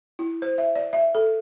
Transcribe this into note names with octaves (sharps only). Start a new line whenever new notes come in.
E4
C5
E5
D5
E5
A4